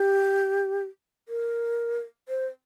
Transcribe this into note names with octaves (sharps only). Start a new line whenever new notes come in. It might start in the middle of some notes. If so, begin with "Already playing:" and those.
Already playing: G4
A#4
C5